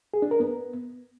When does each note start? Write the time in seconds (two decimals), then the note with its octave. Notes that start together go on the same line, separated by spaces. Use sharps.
0.14 G#4
0.22 D4
0.31 A#4
0.40 B3